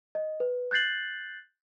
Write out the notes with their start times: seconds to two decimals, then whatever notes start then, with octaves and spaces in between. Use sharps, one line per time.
0.15 D#5
0.40 B4
0.71 F#6 G6 A6 C7 F#7